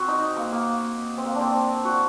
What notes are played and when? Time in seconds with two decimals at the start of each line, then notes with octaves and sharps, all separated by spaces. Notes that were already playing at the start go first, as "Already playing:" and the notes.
Already playing: C4 F#4
0.08 D#4
0.36 A#3
0.52 A#3
1.17 C4
1.26 A#3
1.35 D4
1.41 C4
1.85 F#4